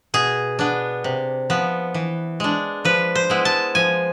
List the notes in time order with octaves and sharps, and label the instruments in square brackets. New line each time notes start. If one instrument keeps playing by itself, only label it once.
[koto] B2 G#4
B3 D4
C3
F3 B3
E3
G#3 D4
F3 B4
C5
G#3 B3 E4
A5
F3 G#5